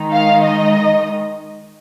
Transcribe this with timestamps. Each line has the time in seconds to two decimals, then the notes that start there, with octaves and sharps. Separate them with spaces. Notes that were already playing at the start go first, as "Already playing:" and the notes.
Already playing: D#3 G#3 D#4
0.12 F5
0.45 D#5